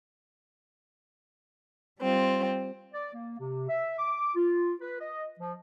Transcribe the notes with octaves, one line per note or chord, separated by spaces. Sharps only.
G3 C4 F4
D5
A#3
C3
E5
D6
F4
B4
D#5
F3